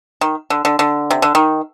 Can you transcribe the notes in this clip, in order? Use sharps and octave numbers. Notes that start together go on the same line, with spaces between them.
D#3
D3
D3
D3
C3
D3
D#3